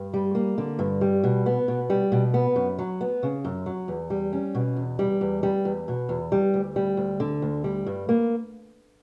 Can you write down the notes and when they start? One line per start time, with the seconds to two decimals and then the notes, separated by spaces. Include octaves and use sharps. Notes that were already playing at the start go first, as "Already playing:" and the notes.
Already playing: G2
0.14 G3
0.35 A#3
0.58 D3
0.79 G2
1.01 G3
1.24 B2
1.46 B3
1.68 B2
1.90 G3
2.12 B2
2.34 B3
2.56 F#2
2.79 F#3
3.01 B3
3.23 C#3
3.45 F#2
3.66 F#3
3.88 E2
4.10 G3
4.33 C#4
4.55 B2
4.76 E2
4.99 G3
5.21 E2
5.43 G3
5.65 E2
5.88 B2
6.09 E2
6.32 G3
6.54 D2
6.76 G3
6.97 D2
7.20 D3
7.42 D2
7.64 G3
7.86 G2
8.09 A#3